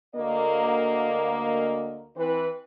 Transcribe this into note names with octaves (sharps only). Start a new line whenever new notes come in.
D2 A#3 D#5
E3 C4 B4